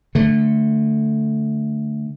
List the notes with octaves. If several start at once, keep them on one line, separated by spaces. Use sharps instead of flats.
D3 A3